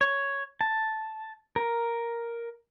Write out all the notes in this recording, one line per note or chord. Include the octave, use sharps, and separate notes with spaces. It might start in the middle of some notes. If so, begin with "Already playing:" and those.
C#5
A5
A#4